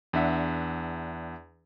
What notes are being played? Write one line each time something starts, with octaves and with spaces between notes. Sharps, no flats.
E2 D4 E5 F#5